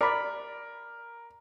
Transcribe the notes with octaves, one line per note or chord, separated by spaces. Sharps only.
A#4 D5 B5